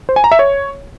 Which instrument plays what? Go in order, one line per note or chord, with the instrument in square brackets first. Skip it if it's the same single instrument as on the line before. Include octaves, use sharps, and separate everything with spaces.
[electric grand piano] C5
G#5
A#5
E5
C#5